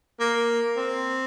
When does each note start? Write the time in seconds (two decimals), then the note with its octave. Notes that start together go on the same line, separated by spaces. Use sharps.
0.20 A#3
0.77 C4